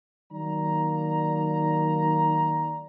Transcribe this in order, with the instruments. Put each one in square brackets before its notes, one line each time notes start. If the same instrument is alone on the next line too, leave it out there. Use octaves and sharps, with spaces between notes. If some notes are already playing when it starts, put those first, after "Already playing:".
[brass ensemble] D#3 F#3 A#3 D5 A#5